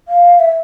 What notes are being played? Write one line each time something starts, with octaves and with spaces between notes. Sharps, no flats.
F5
E5